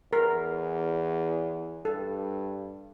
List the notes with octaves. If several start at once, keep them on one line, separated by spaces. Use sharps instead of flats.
E2 A#4
G2 A4